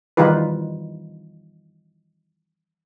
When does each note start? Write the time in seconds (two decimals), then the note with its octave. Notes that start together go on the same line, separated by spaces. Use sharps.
0.17 D#3 E3 G3 D#4 F4 B4